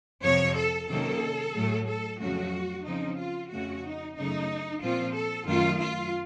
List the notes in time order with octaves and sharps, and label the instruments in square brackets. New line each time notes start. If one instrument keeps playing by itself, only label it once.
[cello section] F2 C3 F3 C4 C#5
A4
C3 D#3 F#3 A#3 C#4 A4
A2 F#3 A3
A4
F2 C#3 F#3 A3 C#4 F#4
C#3 F3 C4 D#4
F4
F2 C#3 A3 C#4 F#4
D#4
F#2 C#3 A3 D#4
A#2 F3 C4 F4
A4
F#2 D#3 A3 F4
F4